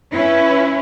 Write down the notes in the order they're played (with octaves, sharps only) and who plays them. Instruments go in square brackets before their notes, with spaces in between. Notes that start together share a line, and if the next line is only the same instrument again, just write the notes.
[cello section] C#4 E4 B4